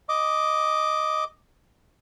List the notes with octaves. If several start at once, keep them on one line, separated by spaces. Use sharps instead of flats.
D#5 D6